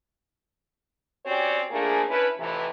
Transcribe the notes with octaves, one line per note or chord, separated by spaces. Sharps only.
C4 C#4 F#4 G4 C#5 D5
F3 A3 A#3 D4 G#4
C#4 D4 E4 B4
F2 A2 C3 E3